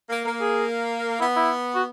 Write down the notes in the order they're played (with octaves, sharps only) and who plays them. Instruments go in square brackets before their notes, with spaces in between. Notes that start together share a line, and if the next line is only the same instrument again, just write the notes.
[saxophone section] A#3
[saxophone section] A#3 [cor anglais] A#4
[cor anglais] G#4
[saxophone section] B3 [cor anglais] E4
[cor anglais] E4
F#4